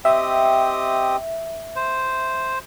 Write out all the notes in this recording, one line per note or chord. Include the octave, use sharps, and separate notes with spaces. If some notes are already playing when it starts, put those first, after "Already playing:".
C4 G4 D#5 E5
C5